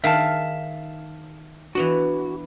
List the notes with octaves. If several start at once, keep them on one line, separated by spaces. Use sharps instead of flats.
D#3 G#4 E5 F5 A5
E3 B3 D4 F#4